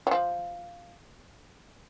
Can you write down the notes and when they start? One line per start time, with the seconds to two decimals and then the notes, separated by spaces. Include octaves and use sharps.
0.07 F#3
0.11 F3